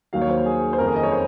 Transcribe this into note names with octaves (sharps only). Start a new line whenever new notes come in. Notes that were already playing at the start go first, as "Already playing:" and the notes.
D#2 D#3 F#3 F5
C#5
C5
G#4
C5
F#1 F2 D#3 A#4
G#4
D#5
C#5
C5